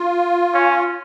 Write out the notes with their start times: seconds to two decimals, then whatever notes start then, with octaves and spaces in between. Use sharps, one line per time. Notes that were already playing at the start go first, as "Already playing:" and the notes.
Already playing: F4
0.54 C#4